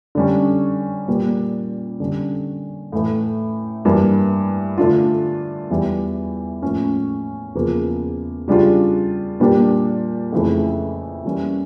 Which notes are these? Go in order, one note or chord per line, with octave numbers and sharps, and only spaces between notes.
D3 G3 C#4
A#2 G3 A#3
D3 G3 C#4
A2 E3 A3
G2 E3 A#3
D3 A3 D4 F4
E2 E3 G3
A2 F3 A#3 C#4
E2 C#3 F3 A#3
C#3 G3 D4 F4
A#2 G3 A#3 D4 G4
F2 C#3 E3 A3 E4
E3 G3 A#3 C#4